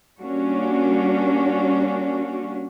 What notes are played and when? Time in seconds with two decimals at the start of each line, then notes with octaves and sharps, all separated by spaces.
0.20 G3 A#3 C#4 D4 F#4